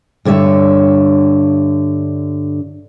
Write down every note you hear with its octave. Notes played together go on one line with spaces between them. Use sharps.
G2 D3 C#5 E5